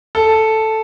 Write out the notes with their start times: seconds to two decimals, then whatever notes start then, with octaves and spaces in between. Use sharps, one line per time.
0.15 A4